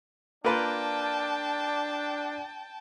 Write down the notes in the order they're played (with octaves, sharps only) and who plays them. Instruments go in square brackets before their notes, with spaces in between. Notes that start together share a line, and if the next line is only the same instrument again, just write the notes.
[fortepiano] A#3 F4 B4 [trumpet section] D4 [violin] G5 A5